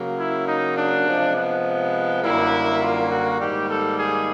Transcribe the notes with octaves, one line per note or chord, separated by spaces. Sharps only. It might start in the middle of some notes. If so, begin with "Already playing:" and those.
Already playing: C#3 F#3 A#3
E4
D#4
D4
C3 F3 G#3
B3
F#2 D3 G3 A#3 E4
F4
F#4
G#2 D#3 G3 A#3 G4
A4
G#4